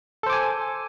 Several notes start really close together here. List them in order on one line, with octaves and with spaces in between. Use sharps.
A4 C5 D6 G#5